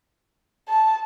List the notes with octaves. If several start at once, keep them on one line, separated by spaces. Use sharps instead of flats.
A5